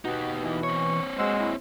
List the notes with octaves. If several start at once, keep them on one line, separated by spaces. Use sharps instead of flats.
B2 D#4 F#4 G4
E3
C4 C#5 C#6
G#3 F#4 G#4 C5 E6
E4